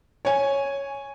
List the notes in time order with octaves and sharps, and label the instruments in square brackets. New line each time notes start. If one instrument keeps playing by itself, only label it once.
[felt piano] C#5 G#5